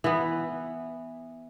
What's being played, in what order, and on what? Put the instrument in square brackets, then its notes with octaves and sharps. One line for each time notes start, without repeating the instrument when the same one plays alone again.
[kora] E3 B3